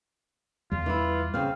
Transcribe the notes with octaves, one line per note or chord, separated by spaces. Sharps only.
E2 G3 F4
E3 E4
C#3 C4 F5